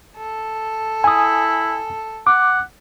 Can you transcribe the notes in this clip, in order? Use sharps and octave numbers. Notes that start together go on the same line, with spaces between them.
A4
E4 G#5 D#6
F#5 D6